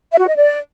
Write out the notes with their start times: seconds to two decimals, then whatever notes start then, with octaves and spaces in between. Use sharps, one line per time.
0.11 E5
0.19 F#4
0.28 D#5
0.36 D5